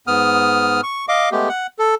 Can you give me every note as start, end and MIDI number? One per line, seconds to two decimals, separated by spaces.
0.07 0.81 44
0.07 0.81 59
0.07 0.81 87
0.07 0.81 89
0.83 1.06 85
1.08 1.29 75
1.08 1.29 77
1.08 1.29 86
1.32 1.49 56
1.32 1.49 57
1.32 1.49 59
1.32 1.49 67
1.49 1.67 78
1.79 1.95 69